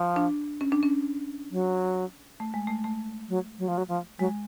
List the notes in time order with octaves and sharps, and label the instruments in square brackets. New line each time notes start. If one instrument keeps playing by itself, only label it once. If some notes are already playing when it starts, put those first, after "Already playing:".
Already playing: [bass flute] F3
[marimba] D4
C#4
D4
C#4
[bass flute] F#3
[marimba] A3
G#3
A3
A3
[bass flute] F#3
F#3
F3
F#3
F3
[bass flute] F#3 [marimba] G#3